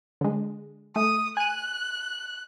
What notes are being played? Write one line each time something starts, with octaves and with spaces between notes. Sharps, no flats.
D3 G#3
A3 D#6
G#5 F#6 D#7